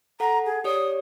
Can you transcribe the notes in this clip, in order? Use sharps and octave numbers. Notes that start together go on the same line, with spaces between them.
A4 F#5 A#5
G#4
G4 C#5 D5 D#6